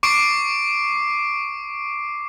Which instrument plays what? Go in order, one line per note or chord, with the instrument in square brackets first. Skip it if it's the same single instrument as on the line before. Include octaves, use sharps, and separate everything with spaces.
[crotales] C#6 D6 C7 D7